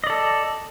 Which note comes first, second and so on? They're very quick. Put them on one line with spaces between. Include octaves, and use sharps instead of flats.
D#5 D5 A4